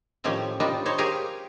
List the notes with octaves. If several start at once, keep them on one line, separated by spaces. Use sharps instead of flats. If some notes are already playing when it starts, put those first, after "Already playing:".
A2 D#3 F3 C#4 G4
D#3 G3 D4 D#4 F4
D#4 C5 C#5
G4 G#4 A#4 F5